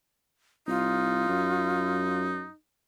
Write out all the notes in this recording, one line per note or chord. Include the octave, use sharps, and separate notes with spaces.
C2 D#4 F4
F#2